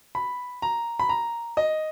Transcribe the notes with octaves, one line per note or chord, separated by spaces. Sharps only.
B5
A#5
B5
A#5
D#5